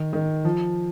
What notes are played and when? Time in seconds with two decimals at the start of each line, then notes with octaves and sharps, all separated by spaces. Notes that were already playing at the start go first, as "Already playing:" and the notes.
Already playing: D#3
0.13 D#3
0.45 F3